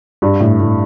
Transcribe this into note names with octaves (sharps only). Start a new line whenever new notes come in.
G2
A2
A2